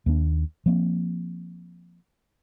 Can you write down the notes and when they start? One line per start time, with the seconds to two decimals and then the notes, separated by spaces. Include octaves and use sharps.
0.06 D#2 D#3 A#3 D4
0.66 F3 A#3 C4